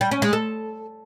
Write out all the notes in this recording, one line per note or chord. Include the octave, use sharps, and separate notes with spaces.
G3
C#4
G#3
A4